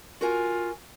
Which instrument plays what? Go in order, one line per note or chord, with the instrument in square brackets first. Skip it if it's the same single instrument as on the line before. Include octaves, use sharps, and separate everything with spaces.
[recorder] F4 [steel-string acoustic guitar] F#4 A#4 G#5